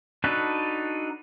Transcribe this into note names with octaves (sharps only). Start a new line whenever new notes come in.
D4 D#4 F#4 A4 B4